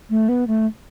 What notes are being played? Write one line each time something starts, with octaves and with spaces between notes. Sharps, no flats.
A3
B3
A3